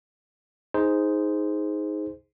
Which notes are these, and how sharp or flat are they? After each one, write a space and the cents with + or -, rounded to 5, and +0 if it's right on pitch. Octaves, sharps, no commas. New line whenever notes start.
D#4 +15 G#4 +0 C5 -10